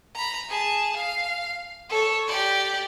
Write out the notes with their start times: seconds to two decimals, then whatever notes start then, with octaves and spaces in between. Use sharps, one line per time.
0.14 A#5 B5
0.48 G#4 A5
0.96 F5
1.89 A4 C#5
2.27 G4 D5